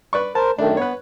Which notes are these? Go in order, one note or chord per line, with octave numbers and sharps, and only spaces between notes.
B4 D5 C#6
A#4 C5 A5
F#2 D#3 A3 D4
B3 B4 C#5